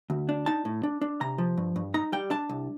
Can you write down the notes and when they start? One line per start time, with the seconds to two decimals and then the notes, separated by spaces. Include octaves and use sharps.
0.10 D2
0.29 D4
0.46 D#4 A5
0.65 A2
0.83 D4
1.01 D4
1.21 C3 A#5
1.38 F3
1.57 G2
1.76 G2
1.94 D#4 A#5
2.12 G3 G5
2.31 D4 A5
2.49 C2